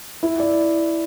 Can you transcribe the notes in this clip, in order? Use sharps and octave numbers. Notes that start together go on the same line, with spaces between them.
E4
D5